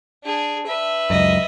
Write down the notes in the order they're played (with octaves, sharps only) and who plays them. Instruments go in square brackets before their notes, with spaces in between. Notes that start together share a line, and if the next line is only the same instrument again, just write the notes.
[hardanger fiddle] D4 G#4
B4 E5
[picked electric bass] C#2 F#2 [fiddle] D#5